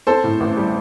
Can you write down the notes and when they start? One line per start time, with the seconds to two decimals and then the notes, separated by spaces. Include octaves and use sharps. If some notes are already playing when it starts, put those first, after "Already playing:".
0.07 C4 A4 C5
0.24 A2
0.40 A1
0.57 G3